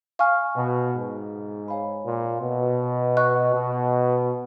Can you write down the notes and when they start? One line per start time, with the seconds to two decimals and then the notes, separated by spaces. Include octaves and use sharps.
0.19 F5 G#5 C#6 F6
0.57 B2
0.94 G#2
1.68 C#5 F5 G#5 B5
2.06 A#2
2.42 B2
3.17 D#5 F#5 C#6 F#6
3.53 B2